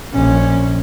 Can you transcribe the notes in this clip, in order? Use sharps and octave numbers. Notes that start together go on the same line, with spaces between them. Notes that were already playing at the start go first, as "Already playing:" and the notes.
A#1 C#4